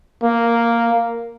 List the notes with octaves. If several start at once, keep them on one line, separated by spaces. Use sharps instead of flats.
A#3